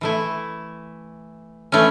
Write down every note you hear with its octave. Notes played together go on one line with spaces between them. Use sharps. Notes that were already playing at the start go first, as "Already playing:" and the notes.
E3 A3 E4
E3 A3 C#4